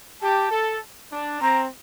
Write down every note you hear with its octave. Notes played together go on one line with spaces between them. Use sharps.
G4 A5
A4
D4
C4 A#5